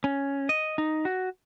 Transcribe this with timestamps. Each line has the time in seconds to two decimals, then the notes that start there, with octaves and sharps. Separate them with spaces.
0.04 C#4
0.49 D#5
0.78 D#4
1.05 F#4